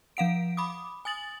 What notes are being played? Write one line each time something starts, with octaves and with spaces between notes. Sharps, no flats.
F3 F5 F#5 D7
B5 D6 D#6
G#5 D#6 A6 F#7